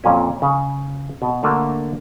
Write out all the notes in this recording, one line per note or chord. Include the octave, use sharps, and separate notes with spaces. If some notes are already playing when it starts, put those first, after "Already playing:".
F2 A#2 C#4
C#3
B2
D3 A3 A#3 D4